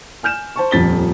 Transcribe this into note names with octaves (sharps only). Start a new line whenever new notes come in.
G#5 F6 G6 E7
C5 A5 C#6
D#1 F2 A6 B6 G7